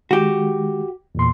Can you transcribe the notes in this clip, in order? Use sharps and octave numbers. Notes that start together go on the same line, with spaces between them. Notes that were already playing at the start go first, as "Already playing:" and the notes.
D#3 G#3 F#4 G4
E2 A#2 C6